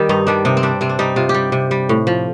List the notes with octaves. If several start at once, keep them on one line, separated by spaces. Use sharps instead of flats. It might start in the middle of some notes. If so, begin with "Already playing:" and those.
Already playing: D#3 G3 G4
G2 D#4
D#3 G3 D4
C3 D#4
C4
G3 D4
C3 C4
D4
G3 D#4
C3 F4
G4
G3
C3
G3
A2
F3